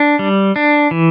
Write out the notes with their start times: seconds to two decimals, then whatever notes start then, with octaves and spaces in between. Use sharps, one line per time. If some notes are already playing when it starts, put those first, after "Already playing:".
Already playing: D4
0.19 G3
0.56 D4
0.91 E3